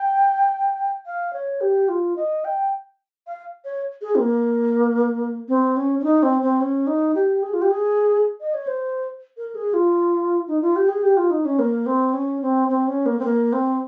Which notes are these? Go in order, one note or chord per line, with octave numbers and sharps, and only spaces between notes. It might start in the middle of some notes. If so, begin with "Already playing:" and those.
Already playing: G5
F5
C#5
G4
F4
D#5
G5
F5
C#5
G#4
C4
A#3
C4
C#4
C#4
D#4
C4
C4
C#4
D#4
G4
G#4
F4
G4
G#4
D#5
C#5
C5
A#4
G#4
F4
D#4
F4
G4
G#4
G4
F4
D#4
C#4
A#3
C4
C#4
C4
C4
C#4
A#3
C4
A#3
C4